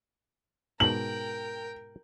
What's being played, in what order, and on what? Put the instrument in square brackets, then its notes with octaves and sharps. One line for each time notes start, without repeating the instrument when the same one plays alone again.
[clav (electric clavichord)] G#2 B2 A5 [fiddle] A#4 G5 [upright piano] F#7